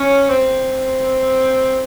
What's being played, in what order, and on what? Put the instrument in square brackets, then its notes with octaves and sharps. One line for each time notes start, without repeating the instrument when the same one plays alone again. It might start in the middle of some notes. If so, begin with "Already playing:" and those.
Already playing: [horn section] C#4
C4